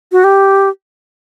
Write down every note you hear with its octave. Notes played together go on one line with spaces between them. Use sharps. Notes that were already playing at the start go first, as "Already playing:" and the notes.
F#4
G4